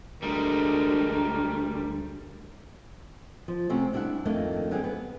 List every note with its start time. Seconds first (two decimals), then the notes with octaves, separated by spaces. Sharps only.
0.22 D2 G3 G#3 A#4
3.48 F3
3.69 C3 A3 C4 C#4 F#4 C5
3.93 G3 D4 E4 E5 F#5
4.25 F2 D#3 A3 A#3 D4
4.71 D3 F#3 G3 C4 G4 G#4
4.84 B3